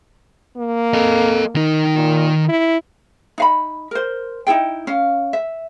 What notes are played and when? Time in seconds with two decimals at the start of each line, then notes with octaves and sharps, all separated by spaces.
0.57 A#3
0.93 A4 D#5
1.55 D#3 D#4
1.95 A#2
2.49 E4
3.38 D#4 F5 B5
3.91 A#4 C5
4.47 D#4 E4 G#4 G5
4.87 C#4 F5
5.33 E5